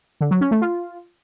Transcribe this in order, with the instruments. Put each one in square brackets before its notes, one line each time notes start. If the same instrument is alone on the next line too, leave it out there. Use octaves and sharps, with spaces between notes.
[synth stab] D3
F#3
C#4
A3
F4